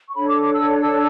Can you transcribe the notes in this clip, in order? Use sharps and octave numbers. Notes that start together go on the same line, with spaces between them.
C#6
D4 A4 C#5 B5
D6
D6
E6
E6